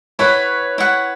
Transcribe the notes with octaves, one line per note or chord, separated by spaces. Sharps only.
E4 B4 C#5 F#5
E4 B4 F#5